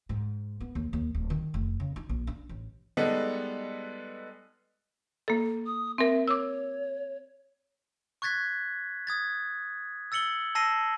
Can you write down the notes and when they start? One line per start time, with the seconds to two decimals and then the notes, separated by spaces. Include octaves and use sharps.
0.09 G#2
0.60 B3
0.75 D#2
0.93 D#2
1.15 D1
1.30 D#3
1.54 F1
1.80 C#3
1.96 D#4
2.09 A#1
2.27 D4
2.49 A1
2.97 G3 G#3 B3 D#4 A4
5.28 A#3 A4
5.66 D#6
5.98 C4 A#4 E5
6.28 C#5 D6 E6
8.22 C#6 F#6 G#6 A6 B6
9.07 D#6 G#6 A6
10.12 E6 A6 C#7 F#7 G7
10.55 A5 E6 A#6 C7 D#7 G7